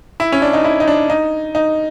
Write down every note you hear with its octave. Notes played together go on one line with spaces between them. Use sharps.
E4
C#4
D4
D#4
E4
D#4
D4
D#4
D#4